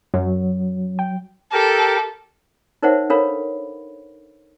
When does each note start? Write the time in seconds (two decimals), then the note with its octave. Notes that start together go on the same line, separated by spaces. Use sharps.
0.14 F#2 F#3
0.99 G5
1.52 G4 A4 A#4
2.82 D#4 A#4 C5 C#5 E5 F#5
3.10 D4 A4 A#4 C#5 F5 B5